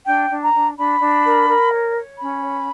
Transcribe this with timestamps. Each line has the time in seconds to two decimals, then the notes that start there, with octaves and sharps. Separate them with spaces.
0.07 D4 G5
0.30 D4
0.42 A#5
0.54 D4
0.78 D4 B5
1.02 D4
1.25 A#4
1.49 A#4
1.72 C#5
1.96 C#5
2.20 C#4 B5
2.44 C#5